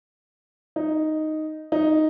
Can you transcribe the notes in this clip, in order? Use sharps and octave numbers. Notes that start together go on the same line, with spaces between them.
D#4
D#4